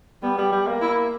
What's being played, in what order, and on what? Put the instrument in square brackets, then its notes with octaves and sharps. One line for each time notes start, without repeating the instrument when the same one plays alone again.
[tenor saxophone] G3 [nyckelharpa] B3
[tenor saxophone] G3
G3
A#3
[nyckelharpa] E4